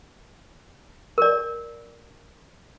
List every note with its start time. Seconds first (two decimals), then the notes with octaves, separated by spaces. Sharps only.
1.18 A#4 D5